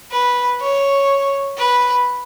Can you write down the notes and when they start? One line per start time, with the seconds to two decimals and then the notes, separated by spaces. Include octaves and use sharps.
0.11 B4
0.61 C#5
1.58 B4